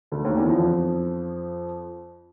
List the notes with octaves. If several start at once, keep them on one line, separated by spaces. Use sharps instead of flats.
D2 D3
D#2 D#3
E2 E3
F2 F3